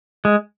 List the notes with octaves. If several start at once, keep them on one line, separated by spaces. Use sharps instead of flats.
G#3